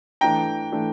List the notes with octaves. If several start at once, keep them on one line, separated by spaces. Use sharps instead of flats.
E3 A3 D4 G5 A#5
E3 A3 D4